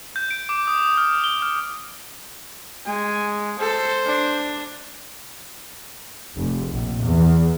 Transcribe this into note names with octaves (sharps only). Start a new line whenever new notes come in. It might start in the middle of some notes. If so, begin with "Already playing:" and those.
G6
D7
D6
D#6
F6
G7
F6
G#3 G#5
A4 C5
D4
F1
A#1
E2